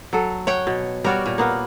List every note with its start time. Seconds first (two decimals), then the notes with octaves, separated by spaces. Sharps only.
0.13 F#3 A4
0.47 C#5 F#5 G5
0.67 B2
1.04 G3 F#4 A#4 C#5 D5
1.26 A#2
1.38 A#3 B3 A#4